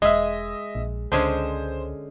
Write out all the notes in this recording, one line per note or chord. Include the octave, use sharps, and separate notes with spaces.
E1 G#3 D#5 E5
A#1
C#2 D3 G#3 C#4 C5